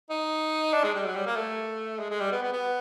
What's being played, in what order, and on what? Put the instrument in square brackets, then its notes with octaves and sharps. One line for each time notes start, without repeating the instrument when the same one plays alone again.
[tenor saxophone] D#4
D4
G#3
G3
F#3
G3
A#3
A3
G#3
G#3
G3
B3
B3
B3